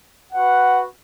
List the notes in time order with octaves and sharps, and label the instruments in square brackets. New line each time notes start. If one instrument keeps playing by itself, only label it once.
[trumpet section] F#4 B4 F#5